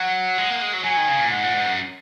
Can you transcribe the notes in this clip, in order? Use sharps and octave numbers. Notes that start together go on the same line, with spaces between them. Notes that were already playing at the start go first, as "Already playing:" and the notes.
Already playing: F#3 F#5
G#3
A#3
G#3
F#3
F#3 G#5
D#3
C#3
A#2
G#2 F#5
A#2
G#2
F#2